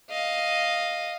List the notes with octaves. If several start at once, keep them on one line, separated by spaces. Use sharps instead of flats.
D#5 F5